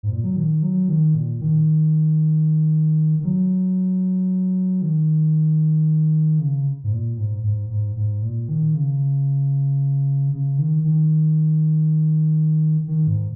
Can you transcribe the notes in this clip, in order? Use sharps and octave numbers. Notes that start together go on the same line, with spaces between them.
G#2
A#2
F#3
D#3
F#3
D#3
A#2
D#3
D#3
F#3
D#3
C#3
G#2
A#2
G#2
G#2
G#2
G#2
A#2
D#3
C#3
C#3
D#3
D#3
D#3
G#2